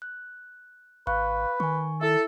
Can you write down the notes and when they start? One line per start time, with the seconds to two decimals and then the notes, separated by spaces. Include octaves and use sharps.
0.02 F#6
1.07 G#1 B4 F5 C#6 F#6
1.60 D#3 G#5 C#6
2.01 E4 A4 E5